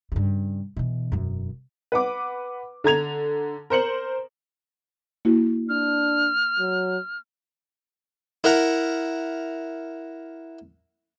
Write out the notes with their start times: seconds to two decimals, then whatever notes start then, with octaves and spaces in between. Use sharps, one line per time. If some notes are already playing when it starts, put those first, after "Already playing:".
0.12 G2 C#3
0.77 B2 E3
1.12 E1 F#2
1.92 B4 F#5 D6
2.84 D3 A#5 G#6 F7
3.70 A#4 C5 C#7 F#7
5.25 A#3 E4 F#4
5.69 D4 F6
6.59 F#3
8.44 E4 A#4 E5 F#5 A#5